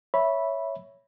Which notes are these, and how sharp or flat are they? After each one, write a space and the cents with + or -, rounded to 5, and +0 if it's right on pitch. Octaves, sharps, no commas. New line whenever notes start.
C#5 +0 E5 +0 B5 -10